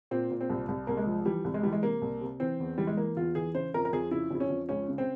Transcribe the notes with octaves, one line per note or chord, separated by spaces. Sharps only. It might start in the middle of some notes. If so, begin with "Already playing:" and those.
A#2 C4
A#2
C4
C2
C2
C2 A#3
G#3
F3
E3 G3
C2
G#3
E3 G3
G#3
C3 A#3
C2
C3
E3 C4
E2
E3 G3
G#3
E3 A#3
E2 F4
E3 G#4
C#3 C5
F2 A#4
A#4
F2 G#4
C#3 E4
F2 E4
C#4
F2
C#2 C#4
C#3
C4